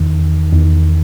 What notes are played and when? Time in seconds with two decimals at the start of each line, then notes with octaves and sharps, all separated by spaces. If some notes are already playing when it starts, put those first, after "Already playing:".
Already playing: E2 D#3
0.52 E2 D#3